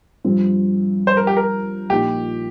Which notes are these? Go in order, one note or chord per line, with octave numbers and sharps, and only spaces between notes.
G2 F3 C4
C5
A#4
G4
A#4
A#1 A#2 F3 A#3 D#4 G4